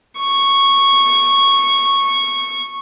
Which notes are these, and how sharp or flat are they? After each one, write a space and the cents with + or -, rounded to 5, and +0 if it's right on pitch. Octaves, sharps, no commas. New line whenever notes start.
C#6 -10